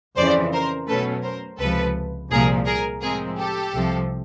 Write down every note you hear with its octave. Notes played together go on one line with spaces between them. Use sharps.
F2 C#3 E3 C5 D5
A#4 C5
B2 F#3 A3 C#4 A4 B4
A#4 C5
C#2 C3 F3 A4 B4
C2 A#2 F3 G#4 A#4
G#4 A#4
A2 F3 G#3 C4 G#4 A#4
G4 A4
C2 C3 F3